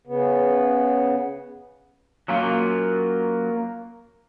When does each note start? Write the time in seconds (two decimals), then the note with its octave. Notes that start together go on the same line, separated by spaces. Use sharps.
0.07 C#3 B3
2.28 F#3 A#3 C#4 F4